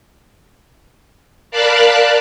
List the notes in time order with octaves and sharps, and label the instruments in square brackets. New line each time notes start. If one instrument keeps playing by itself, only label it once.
[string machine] A#4 D5 F5 A5 B5 F#6